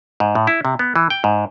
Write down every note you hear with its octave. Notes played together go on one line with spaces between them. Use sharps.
G#2
A2
E4
C3
B3
E3
G5
G#2